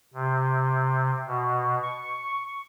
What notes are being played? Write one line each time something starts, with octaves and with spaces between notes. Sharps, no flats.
C3
B2
C#6